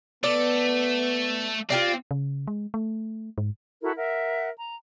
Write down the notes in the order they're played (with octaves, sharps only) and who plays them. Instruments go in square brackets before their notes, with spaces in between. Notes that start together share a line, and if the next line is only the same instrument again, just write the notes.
[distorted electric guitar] A3 [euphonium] B3 [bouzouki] D5
[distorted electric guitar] C4 [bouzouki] F4 G4 D5
[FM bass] C#3
G#3
A3
G#2
[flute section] E4 F#4 A4 A#4
A#4 E5 F#5
A#5